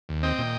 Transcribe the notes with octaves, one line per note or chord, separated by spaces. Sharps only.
D#2
C4 D#5 G5
A#2